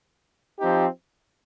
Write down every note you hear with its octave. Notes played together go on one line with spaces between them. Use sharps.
F3 C4 D#4 G4